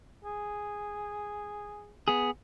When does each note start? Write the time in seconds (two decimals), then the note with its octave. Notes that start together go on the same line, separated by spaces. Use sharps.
0.25 G#4
2.08 B3 G#4